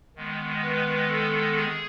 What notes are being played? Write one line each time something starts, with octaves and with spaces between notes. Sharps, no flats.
D#3 G#3 B3
B4
A4
G#4